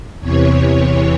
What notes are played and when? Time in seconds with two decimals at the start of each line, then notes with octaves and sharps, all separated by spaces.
0.20 E2 C3 E3 C#5